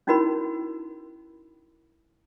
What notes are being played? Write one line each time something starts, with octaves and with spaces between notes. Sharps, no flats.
C#4 D#4 E4 F#4 A#4 B5